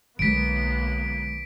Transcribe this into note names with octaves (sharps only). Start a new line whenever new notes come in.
B1 D3 G#3 A#3 B3 B6 D7